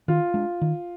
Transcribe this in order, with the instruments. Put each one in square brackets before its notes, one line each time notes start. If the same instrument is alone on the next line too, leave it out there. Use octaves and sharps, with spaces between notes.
[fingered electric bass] D#3 [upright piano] F4
[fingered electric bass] G#3 D4
D#3